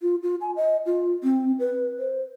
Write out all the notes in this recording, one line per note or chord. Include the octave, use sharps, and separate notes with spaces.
F4
F4
G#5
D#5
F4
C4
B4
C5